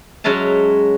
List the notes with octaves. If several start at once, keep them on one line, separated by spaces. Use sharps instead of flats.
F#3 G#3 C#4 E5 A5